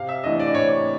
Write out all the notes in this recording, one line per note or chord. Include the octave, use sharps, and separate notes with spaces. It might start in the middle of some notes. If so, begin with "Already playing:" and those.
Already playing: C3 F5
E5
E3 A3 D4 D#5
D5
C3 C#5